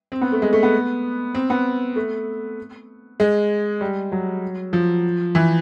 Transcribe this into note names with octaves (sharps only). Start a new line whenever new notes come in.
C4
B3
A3
G#3
A3
B3
C4
B3
A3
G#3
G3
F#3
F3
E3